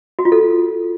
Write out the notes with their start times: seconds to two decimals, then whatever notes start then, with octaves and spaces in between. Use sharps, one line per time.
0.19 F#4
0.25 F4
0.32 A4